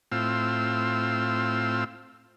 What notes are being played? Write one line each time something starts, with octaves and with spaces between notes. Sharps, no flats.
A2 C4 F4 E6